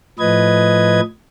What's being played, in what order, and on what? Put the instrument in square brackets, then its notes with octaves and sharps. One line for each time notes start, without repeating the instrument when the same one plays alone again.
[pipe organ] A2 F3 B4 D#5 G#6